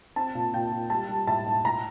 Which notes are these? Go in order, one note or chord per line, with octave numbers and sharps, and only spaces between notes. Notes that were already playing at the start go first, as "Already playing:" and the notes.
C4 A5
A#2
A#2 G5
A#2
G3 A5
G3
A2 A5
A2
A2 A#5